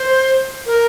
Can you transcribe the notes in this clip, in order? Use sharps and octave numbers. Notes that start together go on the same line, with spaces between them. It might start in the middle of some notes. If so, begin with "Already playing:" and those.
Already playing: C5
A#4